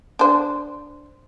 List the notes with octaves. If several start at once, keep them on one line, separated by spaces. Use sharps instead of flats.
D4 C5